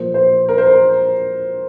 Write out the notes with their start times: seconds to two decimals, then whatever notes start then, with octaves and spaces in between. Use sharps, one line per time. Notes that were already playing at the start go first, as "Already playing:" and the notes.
Already playing: A#2 F3 A#3 C5
0.14 C5
0.49 A#4
0.58 C5
0.67 A#4